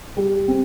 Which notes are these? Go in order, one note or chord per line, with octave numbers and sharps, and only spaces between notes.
G3
C4